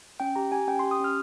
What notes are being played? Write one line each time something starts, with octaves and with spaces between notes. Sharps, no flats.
C#4 G5
G4 A#5
G4 G#5
C#4 G5
G4 C6
D#6
C#4 F6